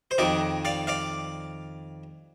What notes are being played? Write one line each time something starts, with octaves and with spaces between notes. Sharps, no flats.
C5
F2 D#3 A#4 D5
D5 F5
D5 F5